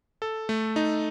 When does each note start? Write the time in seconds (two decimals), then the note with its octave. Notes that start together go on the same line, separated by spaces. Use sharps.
0.22 A4
0.49 A3
0.76 D#4